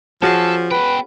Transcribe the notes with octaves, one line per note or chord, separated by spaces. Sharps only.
F3 C#4 F#4 G#4 A4
B3 B4 G5